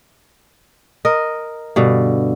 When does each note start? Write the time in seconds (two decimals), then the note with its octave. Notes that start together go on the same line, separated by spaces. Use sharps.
1.05 A#4 D#5
1.76 G2 B2 D3